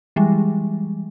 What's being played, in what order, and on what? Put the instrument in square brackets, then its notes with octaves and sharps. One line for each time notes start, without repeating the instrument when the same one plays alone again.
[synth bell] E3 G3 G#3